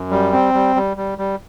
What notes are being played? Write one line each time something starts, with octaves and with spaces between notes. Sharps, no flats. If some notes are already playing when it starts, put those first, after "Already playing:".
Already playing: F#2
G3
C4
G3
G3
G3
G3